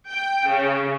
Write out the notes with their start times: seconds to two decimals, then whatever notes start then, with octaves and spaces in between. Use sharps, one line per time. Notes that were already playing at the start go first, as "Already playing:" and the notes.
0.10 G5
0.48 C#3